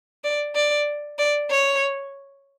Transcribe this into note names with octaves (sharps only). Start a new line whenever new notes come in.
D5
D5
D5
C#5